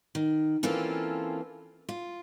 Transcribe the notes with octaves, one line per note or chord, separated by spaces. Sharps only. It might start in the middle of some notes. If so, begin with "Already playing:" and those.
D#3
E3 A#3 C4 C#4 F4 A4
F4